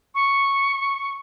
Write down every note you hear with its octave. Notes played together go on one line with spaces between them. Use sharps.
C#6